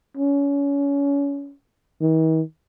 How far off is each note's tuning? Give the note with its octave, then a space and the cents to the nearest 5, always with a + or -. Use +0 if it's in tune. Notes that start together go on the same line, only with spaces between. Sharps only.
C#4 +30
D#3 +45